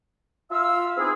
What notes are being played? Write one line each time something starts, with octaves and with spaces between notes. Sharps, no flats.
F4 E5 F5 E6
B3 C4 D#4 E4 G#4